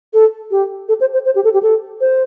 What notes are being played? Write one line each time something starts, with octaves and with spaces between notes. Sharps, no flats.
A4
G4
A4
C5
C5
C5
G4
A4
G4
A4
C5